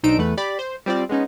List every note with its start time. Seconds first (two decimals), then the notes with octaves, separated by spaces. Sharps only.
0.03 B1 D4 D#4 C5 E6 D7
0.18 E2 A3 B4
0.37 G4 D5 B5
0.59 C5
0.86 G3 C4 F4 D5
1.09 G#3 B3 C#4 D#4